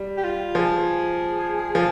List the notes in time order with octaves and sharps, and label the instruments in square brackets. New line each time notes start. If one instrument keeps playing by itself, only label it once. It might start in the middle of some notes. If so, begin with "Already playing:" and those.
Already playing: [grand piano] G3
[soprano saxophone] G4
F4
[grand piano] F3 [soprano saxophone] G#4
[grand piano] F3